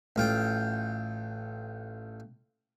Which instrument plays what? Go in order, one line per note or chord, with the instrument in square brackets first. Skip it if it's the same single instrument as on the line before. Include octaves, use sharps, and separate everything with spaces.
[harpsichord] A1 F4 G5